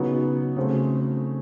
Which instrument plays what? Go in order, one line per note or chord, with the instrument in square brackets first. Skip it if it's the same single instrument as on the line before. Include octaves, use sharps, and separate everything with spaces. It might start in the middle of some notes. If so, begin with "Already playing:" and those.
Already playing: [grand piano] C#3 F#3 B3 D#4
C#3 F#3 A3 C4